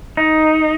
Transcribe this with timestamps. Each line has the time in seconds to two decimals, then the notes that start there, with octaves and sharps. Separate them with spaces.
0.17 D#4